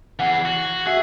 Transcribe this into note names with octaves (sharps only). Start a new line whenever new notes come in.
E3 G#4 F#5
F#4
F#4 G#4 E5